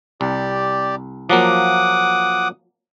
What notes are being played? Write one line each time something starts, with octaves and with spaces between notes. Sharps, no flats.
C2 G4 D5
F3 F#3 A#3 F#5 D6 D#6